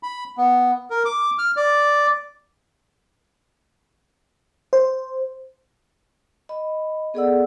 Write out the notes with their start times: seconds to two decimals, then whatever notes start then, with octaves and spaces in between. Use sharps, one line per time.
0.03 B5
0.38 B3
0.90 A#4
1.05 D6
1.39 F6
1.57 D5
4.73 C5
6.49 D#5 B5
7.14 B3 G#4 A4 D5 F#5 E6